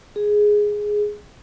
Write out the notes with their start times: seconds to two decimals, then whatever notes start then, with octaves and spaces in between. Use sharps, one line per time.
0.16 G#4